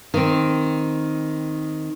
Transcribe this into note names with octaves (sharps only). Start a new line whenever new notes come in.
D#3 C4